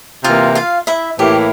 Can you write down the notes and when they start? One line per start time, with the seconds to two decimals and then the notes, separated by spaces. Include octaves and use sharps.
0.24 C3 E3 A#3 F4 F5
0.55 F4 F5
0.87 E4 E5
1.19 A2 E3 A#3 E4 G4